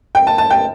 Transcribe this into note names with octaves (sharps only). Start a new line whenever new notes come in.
G5
A5
A5
G5